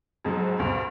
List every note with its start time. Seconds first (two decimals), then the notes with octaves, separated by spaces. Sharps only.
0.25 F2 G#2 F#3
0.59 D2 G2 B2